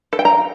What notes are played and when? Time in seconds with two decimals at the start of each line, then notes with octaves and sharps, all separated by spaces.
0.13 A4
0.19 G5
0.25 A#5